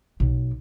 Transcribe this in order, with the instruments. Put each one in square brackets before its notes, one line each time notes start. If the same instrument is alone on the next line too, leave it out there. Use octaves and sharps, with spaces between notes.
[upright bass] B1